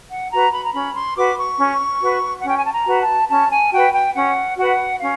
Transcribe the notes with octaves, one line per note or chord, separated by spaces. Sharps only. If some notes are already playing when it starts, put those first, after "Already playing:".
F#5
F#4 B4 A#5
B5
A#5
C#4 B5
C6
F#4 B4 D6
C#6
C#4
F#4 B4
F#5
C#4 G5
G#5
A5
A#5
F#4 B4
A5
C#4 A5
G#5
F#4 B4 G5
G5
C#4 F#5
F#4 B4 F#5
C#4 F5